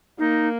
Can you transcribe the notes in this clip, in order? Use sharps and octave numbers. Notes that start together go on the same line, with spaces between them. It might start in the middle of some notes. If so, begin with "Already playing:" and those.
A#3 D#4